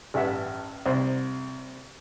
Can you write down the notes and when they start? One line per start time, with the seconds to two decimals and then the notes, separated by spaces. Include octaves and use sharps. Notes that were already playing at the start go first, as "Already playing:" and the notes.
0.14 A1 G2 E5 F#5
0.86 C2 C5